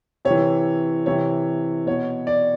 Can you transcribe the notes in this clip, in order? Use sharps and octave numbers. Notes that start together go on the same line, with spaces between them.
C3 C#5
E3
C3 E3 C#5
B2 C#5
D5